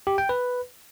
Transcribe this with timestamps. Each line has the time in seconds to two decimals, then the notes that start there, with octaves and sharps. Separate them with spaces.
0.07 G4
0.18 G5
0.29 B4